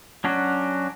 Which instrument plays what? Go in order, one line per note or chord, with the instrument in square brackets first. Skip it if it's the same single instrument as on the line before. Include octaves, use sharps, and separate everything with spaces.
[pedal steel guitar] F#3 C#4 D4 F#4